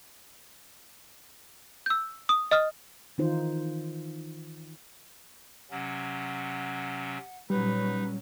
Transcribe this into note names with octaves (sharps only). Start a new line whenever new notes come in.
E6 G6
D#6
D#5 D#6 F6
D#3 E3 D#4 F4 C5
C3 F#3 C#4 F#5
A#2 F#3 G3 C#4 D#4 B4